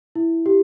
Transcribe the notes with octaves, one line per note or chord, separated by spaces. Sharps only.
E4
G4